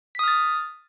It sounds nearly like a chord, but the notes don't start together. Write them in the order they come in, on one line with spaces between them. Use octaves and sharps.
B6 D#6 F6 A6